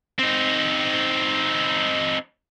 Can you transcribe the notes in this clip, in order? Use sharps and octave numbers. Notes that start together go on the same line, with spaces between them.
C4 D#4